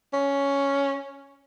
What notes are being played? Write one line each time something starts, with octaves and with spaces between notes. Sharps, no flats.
C#4